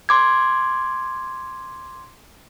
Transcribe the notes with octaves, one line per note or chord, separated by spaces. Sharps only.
C6 D6 G#6